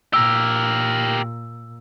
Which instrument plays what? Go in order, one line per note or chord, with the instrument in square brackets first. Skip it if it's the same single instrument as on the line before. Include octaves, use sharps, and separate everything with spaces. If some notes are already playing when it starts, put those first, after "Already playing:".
[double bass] A#2 [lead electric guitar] G4 A#4 [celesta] E6